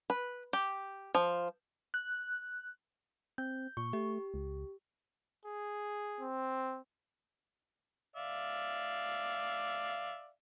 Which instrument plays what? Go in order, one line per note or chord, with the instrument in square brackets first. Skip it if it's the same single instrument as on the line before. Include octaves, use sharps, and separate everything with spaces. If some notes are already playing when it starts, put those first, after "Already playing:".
[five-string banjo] B4
G4
F3
[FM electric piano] F#6
[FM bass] C4 [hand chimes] G6
[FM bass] A#2 [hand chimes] C#6
[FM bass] A3 [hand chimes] G4
[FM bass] C#2
[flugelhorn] G#4
[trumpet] C4
[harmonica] D5 E5 F5